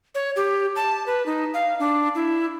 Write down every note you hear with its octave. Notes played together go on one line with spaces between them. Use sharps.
C#5
G4
A5
B4
D#4
F5
D4
E4